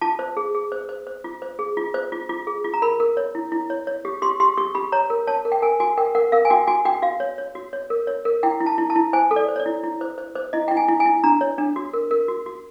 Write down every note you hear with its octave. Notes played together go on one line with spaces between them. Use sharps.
F4 A5
C5
G#4
G#4
C5
C5
C5
F4
C5
G#4
F4
C5
F4
F4
G#4
F4
A#5
A#4 B5
A#4
C#5
E4
E4
C#5
C#5
G4
G4 C6
G4 C6
G4 C#6
G4 B5
C#5 A#5
A#4
C#5 A5
A#4
G5
A#4 G#5
F#4 G#5
A#4 G5
A#4 F#5
A#4 F5
G#5
F#4 G5
F#4 G#5
F#4 G5
F#4 F5
C#5
C#5
F#4
C#5
A#4
C#5
A#4
E4 G5
E4
A5
E4
A5
E4
C5 G#5
A4
D5
C5
C#5
D5
E4
E4
C5
C5
C5
E4 D#5
E4 G5
G#5
E4
G#5
E4
D4 A#5
C#5
D4
F#4
A#4
A#4
F#4
F#4